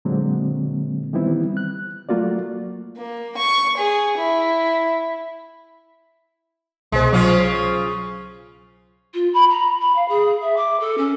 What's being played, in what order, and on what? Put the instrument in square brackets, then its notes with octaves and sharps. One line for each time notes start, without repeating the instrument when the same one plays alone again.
[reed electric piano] A#2 D3 F#3 G#3 A#3 C4
D#3 E3 G3 B3 C4 E4
F#6
F#3 A3 A#3 F4 F#4 D5
[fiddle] A#3
C#6
G#4
E4
[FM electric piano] C2 B2 C5 [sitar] G#3
[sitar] C#3 C#4 F4 [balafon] F#3
[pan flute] F4
B5
A#5
B5
F5
G#4
E5
D6
A4
C#4